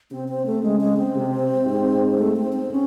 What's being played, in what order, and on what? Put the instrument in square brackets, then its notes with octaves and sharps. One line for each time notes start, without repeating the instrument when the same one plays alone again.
[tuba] C3 [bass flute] C4
[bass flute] C4
A3
[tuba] C#3 [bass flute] G#3
[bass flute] G#3
C4
[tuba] C3
G#2
[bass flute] A3
C4
C4
C#4